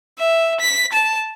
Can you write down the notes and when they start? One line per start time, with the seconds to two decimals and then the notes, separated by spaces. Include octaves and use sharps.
0.18 E5
0.60 B6
0.93 A5